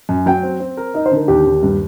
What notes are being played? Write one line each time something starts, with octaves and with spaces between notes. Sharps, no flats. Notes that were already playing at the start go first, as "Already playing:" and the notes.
F#2
F#3 G5
C4
C4
A#4
D#4 D#5
C5
D3
A#4
D#2 G4
D#2
G2